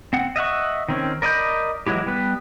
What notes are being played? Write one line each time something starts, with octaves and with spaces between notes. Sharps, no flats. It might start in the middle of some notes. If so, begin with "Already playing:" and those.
C4 F#5
D#5 E5 F#5 C#6
D#3 C4 C#4
A#4 D5 D#5 B5 G6
E3 F#3 G#3 E4 G4
G3 B3 B4